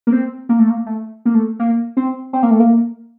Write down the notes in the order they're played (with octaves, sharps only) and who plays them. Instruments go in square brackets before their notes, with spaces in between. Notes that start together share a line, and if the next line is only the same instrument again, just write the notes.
[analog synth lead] A#3
C4
A#3
A3
A#3
A3
A#3
A3
A#3
C4
C4
A#3
A3
A#3